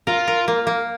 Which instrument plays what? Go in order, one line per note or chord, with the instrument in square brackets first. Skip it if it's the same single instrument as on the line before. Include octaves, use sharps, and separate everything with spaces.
[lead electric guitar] F4 [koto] A#4
[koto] A#4
A#3
A#3